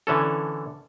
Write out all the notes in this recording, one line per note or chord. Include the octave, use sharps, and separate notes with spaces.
D3 E3 C#4 A4